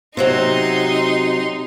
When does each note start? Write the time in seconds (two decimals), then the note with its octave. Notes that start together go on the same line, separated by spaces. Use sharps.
0.17 C3 F#3 C4 D#4 C6